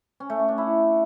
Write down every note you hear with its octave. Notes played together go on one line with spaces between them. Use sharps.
C#4
A3
C#4
D4
E4